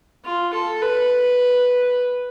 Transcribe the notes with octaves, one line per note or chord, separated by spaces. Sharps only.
F4
A4
B4